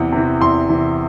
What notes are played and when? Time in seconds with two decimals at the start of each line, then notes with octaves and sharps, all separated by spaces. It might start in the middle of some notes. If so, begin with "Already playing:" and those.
Already playing: E2 C3 E3
0.12 C3 E3
0.41 E2 C6
0.70 C3 E3